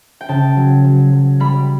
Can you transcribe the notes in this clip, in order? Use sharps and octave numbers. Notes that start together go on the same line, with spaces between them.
G5
C#3 A5
F#3
F#3
F#3
G3 B5